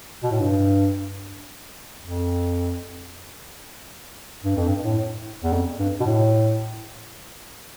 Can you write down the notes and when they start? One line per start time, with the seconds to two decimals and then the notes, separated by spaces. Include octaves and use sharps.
0.23 B2
0.31 A2
0.40 G2
2.02 F2
4.44 G2
4.56 F2
4.68 G2
4.84 A2
5.44 E2
5.53 F2
5.79 G2
6.00 B2
6.06 A2